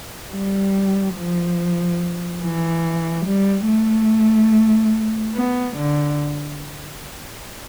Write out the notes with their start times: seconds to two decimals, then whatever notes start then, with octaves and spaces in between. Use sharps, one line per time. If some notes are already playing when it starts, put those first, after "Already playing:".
0.32 G3
1.16 F3
2.42 E3
3.25 G3
3.67 A3
5.34 B3
5.76 D3